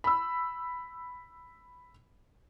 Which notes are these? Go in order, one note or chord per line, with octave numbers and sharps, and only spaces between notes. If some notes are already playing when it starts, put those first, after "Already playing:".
B5 E6